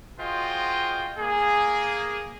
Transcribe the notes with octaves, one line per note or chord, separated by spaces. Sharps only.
F4 F#4 G#4 C5 D#5 G5
A#3 G#4